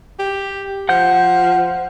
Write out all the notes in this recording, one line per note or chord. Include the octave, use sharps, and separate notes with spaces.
G4
F3 F#5 G6